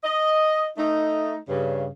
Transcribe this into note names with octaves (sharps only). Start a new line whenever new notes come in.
D#5
A3 D#4
G2 C#3